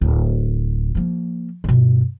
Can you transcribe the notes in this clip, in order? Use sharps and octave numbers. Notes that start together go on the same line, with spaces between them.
D1
F3 A#3
G2 B2